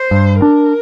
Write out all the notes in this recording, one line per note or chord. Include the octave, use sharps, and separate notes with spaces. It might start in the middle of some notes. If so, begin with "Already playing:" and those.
Already playing: C5
G2
D4 A#4